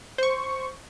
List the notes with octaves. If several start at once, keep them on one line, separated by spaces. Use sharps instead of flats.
C5 C#6